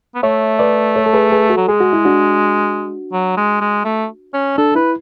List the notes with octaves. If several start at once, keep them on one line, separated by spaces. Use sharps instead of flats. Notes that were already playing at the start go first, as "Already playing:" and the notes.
B3
A3 C#5 E5
B4 D5
A4 C#5
A4
G#4 B4
G#4 B4
F#4 A4
F#3
G#3 G#4
F#4
E4
D4 F#4
F#3
G#3
G#3
A3
C#4
D4 A4
E4 B4